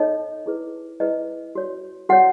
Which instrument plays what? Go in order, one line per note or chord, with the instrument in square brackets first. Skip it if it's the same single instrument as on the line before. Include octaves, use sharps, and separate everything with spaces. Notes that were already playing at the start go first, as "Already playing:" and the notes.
Already playing: [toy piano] D#4 A4 C#5 D#5
E4 G#4 B4
E4 G#4 B4 D#5
F#4 C#5
F#4 C#5 F#5